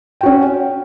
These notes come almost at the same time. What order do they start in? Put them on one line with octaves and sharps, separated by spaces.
G5 F#4 C#4